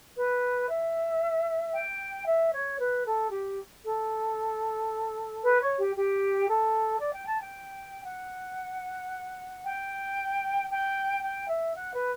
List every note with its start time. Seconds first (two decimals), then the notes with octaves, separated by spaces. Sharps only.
0.16 B4
0.68 E5
1.73 G5
2.26 E5
2.53 C#5
2.79 B4
3.05 A4
3.31 G4
3.84 A4
5.43 B4
5.60 C#5
5.78 G4
5.95 G4
6.48 A4
7.00 D5
7.13 G5
7.27 A5
7.40 G5
8.06 F#5
9.63 G5
10.69 G5
11.22 G5
11.48 E5
11.75 F#5
11.93 B4